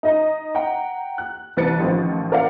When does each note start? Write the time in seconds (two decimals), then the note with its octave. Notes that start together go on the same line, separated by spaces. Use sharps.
0.03 D#4 D#5 A#5
0.55 F#5 G5 A#5
1.18 F#6
1.57 C2 E3 B4 A6 C#7
1.80 A1 D#3 F3
2.32 A#4 D5 F5 F#5